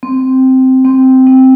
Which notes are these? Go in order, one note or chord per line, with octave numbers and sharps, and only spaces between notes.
C4
C4
C4